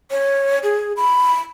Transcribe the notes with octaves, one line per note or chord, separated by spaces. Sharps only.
C#5
G#4
B5